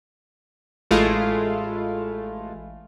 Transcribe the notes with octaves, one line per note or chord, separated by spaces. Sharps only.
A1 G#3 A3 E4 F4 F5